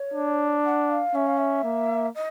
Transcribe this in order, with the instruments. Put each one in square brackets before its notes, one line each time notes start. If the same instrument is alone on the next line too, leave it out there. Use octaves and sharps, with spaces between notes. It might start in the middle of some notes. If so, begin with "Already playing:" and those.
Already playing: [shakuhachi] C#5
[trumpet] D4
[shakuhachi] F#5
F5
[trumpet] C#4 [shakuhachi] E5
[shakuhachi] F5
E5
[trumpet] A#3
[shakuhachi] D#5